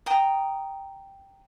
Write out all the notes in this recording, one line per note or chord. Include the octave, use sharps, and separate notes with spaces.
G5 A#5 D#6